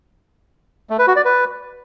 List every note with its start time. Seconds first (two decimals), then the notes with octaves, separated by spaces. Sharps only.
0.90 A3
0.99 B4
1.08 F#4
1.16 D5
1.25 B4